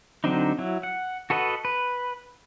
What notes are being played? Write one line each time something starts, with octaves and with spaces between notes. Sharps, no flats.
D3 F#3 C4 D4 D#4
F#3 E4
F#5
F#4 A4 B4 D#5 F#5
B4